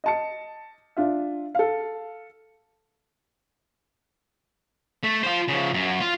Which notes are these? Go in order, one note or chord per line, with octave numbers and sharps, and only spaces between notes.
D#5 A5 C#7
D4 F4 E5
A4 F5
A3
F4 C5
C#3 F3
F#2
F4